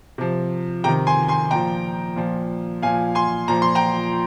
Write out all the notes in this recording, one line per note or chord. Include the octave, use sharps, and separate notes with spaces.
C3 F3
C3 D#3 G5 A#5
G#5 C6
G#5 C6
A#2 F3 G5 A#5
A#2 F3
A#2 F3 F5 G#5
G#5 C6
A#2 F3 A#5
C6
G5 A#5